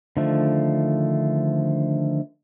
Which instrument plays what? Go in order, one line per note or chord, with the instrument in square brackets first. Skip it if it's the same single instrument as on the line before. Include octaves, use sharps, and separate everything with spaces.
[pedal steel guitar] D3 D#3 F3 A3